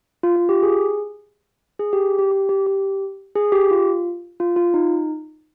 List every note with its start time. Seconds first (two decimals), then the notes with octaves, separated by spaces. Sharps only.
0.23 F4
0.36 F4
0.49 G4
0.63 G#4
1.79 G#4
1.93 G4
2.19 G4
2.32 G4
2.49 G4
2.67 G4
3.36 G#4
3.52 G4
3.71 F4
4.40 F4
4.56 F4
4.74 D#4